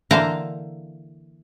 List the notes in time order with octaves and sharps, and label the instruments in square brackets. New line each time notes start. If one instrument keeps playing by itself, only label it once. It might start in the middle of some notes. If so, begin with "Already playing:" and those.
[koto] D3 E3 A#3 C5 F5 A#5